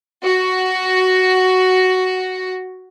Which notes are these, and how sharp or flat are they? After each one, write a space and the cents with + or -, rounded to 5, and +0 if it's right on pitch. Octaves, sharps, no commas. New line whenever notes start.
F#4 +5